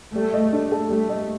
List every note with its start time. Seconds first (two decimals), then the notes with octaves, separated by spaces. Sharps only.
0.15 G3 A3
0.34 D#5
0.53 D4
0.72 A4
0.90 G3 A3
1.09 D#5